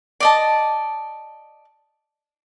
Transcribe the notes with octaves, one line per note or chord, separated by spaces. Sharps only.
D5 D#5 A5